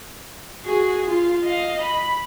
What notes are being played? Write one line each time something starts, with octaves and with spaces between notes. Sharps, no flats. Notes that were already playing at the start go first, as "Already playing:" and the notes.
F#4 G#4
F4
D#5 F5
B5